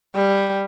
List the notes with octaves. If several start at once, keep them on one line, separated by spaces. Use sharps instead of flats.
G3